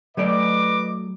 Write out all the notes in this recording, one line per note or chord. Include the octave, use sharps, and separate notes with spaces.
F#3 A3 B4 D5 D#5 D6